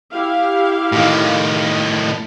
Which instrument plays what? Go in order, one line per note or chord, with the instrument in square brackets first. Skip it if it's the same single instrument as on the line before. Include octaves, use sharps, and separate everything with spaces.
[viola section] E4 G4 F5
[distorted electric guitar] A2 D#3